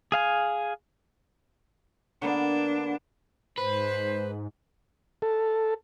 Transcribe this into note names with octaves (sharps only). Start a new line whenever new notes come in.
G#4 F5 G#5
D3 A#3 B3 D4
G#2 B4 C5
A4